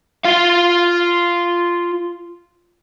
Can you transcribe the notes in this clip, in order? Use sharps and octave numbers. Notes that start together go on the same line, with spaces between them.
F4 F5